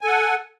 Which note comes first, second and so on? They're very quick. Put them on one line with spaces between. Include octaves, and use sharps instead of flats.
G#5 A4 F#5